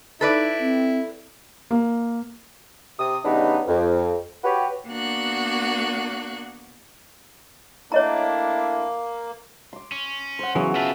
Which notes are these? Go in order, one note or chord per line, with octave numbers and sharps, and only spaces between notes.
D#4 E4 A4 B4 D5
C4
A#3
C3 D#6
C#3 E3 G3 B3 D4 D#4
F2
F#4 G4 B4 C#5
A#3 B3 D4 F#4 F#6
A3 A#3 D4 E4 C#5 D#5 A#5
C6 D6
C#4
C5 F#5
C#3 E3 F#3 B3 F#4
C4 F4 B4 E5 A5